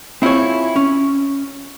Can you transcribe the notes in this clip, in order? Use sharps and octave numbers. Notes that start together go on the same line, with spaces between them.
C4 E4 F4 G#4 C#5
C#4